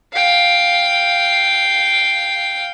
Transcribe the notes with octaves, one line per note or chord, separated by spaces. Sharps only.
F5 G5